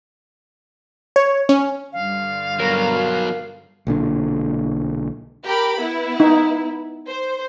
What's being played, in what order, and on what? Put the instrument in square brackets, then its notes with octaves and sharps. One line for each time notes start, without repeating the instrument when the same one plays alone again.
[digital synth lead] C#5
C#4
[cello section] G2 D3 [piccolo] F5
[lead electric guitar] B2 F#3 [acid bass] A#4
[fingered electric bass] B1 A#2 D3
[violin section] G4 A#4 B5
B3 E4
[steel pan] D#4
[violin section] C5